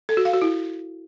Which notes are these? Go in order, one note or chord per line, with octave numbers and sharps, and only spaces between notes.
A4
F#4
F5
F#4
E4